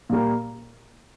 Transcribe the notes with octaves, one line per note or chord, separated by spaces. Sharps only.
A#2 G3 A#3